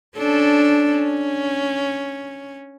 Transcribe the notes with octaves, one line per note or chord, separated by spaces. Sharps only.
C#4 D4 A4
C#4